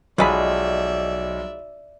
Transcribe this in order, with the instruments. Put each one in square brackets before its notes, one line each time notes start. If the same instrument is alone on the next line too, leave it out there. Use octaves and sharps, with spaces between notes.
[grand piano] B1 [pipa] F3 G#3 B5 [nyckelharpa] D5 E5